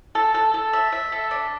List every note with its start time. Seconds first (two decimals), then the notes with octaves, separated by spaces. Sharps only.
0.15 A4
0.34 A4
0.54 A4
0.73 E5
0.92 E5
1.12 A4
1.31 D4